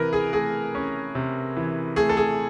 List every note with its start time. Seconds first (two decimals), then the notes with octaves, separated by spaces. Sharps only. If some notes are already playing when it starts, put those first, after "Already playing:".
Already playing: C3 E3 A#4 B4
0.13 G#4
0.33 A3 G#4
0.75 C#4
1.15 C3
1.57 E3
1.96 A3 G#4
2.09 A4
2.17 G#4